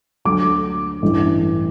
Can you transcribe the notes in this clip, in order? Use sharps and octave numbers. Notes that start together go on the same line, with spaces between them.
D2 D3 F#3 D6
A1 G2 E3